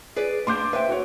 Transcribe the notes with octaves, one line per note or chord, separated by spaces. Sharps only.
G#4 B4 D5
A#3 D4 C6 D6 G6
B4 C5 E5 G5
F#4 C#5